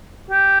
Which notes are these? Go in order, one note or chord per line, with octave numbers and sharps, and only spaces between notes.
G4